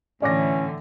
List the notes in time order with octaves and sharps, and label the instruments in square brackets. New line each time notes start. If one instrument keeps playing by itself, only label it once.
[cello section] A2 D3 E3 [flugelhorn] C#4 [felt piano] D5 D6 A#6